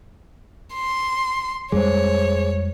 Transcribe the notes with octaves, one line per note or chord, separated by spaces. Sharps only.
C6
F2 G3 G#3 G#4 C5 C#5